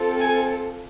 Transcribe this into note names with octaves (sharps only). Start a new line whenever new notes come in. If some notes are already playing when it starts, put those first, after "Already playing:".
Already playing: C4 F4 A4
G#5